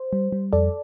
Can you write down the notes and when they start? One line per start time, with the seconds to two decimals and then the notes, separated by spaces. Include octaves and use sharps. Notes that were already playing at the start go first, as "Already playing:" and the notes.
Already playing: C5
0.13 G3
0.32 G3
0.53 F2 A4 D5